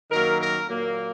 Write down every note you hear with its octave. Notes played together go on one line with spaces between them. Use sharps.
F#2 D#3 F#3 A#3 A#4
A#4
A#2 F#3 A#3